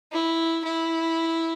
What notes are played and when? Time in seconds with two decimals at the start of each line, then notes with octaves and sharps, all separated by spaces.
0.12 E4
0.64 E4